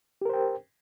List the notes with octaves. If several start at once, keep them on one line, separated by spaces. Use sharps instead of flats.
G4 A#4 C5 G5